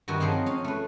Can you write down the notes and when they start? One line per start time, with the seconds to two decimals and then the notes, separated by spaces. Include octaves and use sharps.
0.08 G2 D#3 F#4 D#5 E5
0.20 F3 F#3 C4 G#4 F5
0.46 C#4 F5
0.64 A3 B4